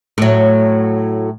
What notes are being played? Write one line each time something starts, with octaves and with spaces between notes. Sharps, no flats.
A2 F#3